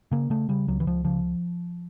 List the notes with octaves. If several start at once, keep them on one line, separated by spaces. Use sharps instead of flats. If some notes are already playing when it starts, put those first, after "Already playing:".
C#3 A#3
C#3 A3
C#3 G3
C#2 F#3
E3
C#2 F3
C#3 F3